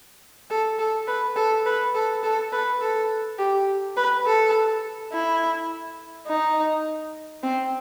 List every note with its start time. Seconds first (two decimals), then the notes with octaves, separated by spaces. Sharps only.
0.50 A4
0.79 A4
1.08 B4
1.36 A4
1.66 B4
1.95 A4
2.23 A4
2.53 B4
2.81 A4
3.39 G4
3.97 B4
4.26 A4
5.12 E4
6.27 D#4
7.43 C4